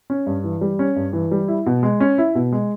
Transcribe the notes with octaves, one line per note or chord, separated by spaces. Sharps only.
C#4
G2
E3
G3
C#4
G2
E3
G3
E4
B2
G#3
C#4
E4
B2
G#3